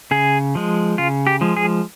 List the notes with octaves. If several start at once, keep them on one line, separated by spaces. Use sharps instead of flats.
C#3 G#4
F3 G#3
C#3 F4
G4
F3 G#3
G#4